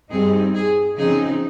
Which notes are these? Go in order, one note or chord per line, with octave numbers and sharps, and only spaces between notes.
G2 G3 C4 D#4 G#4
G#4
C#3 F3 C4 D#4 G#4